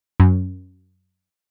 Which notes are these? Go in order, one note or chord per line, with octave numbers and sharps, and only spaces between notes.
F#2